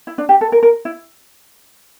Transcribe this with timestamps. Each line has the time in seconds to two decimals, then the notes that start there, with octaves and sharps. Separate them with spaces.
0.07 E4
0.18 D4
0.29 G4
0.41 A4
0.52 A#4
0.63 A#4
0.85 E4